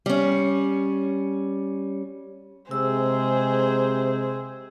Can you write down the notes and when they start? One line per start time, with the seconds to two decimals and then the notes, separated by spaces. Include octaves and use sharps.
0.06 G3 C#4
2.71 C3 G#3 G#4 C5 E6